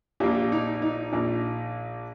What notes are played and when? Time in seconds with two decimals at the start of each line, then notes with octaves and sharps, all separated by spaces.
0.20 A#1 A#2 G4
0.52 D#4
0.82 D#4
1.12 A#1 A#2